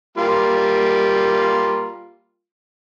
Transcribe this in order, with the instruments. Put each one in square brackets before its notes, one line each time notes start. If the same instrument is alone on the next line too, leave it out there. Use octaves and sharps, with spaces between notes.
[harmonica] G3 A#3 F4